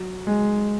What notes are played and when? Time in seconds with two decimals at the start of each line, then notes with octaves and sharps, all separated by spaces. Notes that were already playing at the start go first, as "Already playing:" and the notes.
Already playing: F#3
0.27 G#3